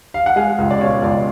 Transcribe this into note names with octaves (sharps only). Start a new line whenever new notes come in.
F5
F#5
G#3 F5 G#5
C#2
D5
B2 C#5 F5
C#2 D5